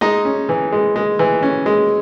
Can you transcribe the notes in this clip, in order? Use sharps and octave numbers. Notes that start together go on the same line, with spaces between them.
G#3 D#4 D#5
C#4
E3
G#3
G#3
E3
C#4
G#3